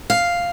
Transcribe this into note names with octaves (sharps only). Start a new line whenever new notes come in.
F5